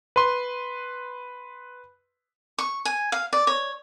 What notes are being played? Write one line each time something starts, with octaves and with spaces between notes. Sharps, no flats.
B4 C6
C#6
G#5
F5
D5
C#5